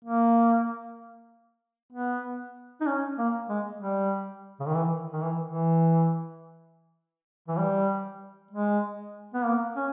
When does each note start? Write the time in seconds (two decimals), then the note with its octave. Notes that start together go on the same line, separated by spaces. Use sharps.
0.05 A#3
1.93 B3
2.81 D#4
2.87 C#4
3.18 A#3
3.49 G#3
3.81 G3
4.60 C#3
4.67 D#3
4.75 E3
5.13 D#3
5.22 E3
5.46 E3
7.48 E3
7.58 G3
8.51 G#3
9.34 B3
9.45 A#3
9.76 C#4